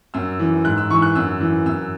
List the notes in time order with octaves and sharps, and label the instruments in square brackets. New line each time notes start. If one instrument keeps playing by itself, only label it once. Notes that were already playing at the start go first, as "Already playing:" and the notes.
[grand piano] F#2 E6
E3
G#2 F#6
E6
E3 C#6
F#6
F#2 E6
E3
F#2 E6